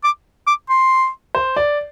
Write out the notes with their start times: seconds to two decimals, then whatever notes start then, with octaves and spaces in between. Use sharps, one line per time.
0.04 D6
0.47 D6
0.69 C6
1.35 C5
1.57 D5